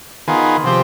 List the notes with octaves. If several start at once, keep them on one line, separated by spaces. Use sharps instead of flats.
D#3 B3 F4 G#4
C3 F3 C4 G4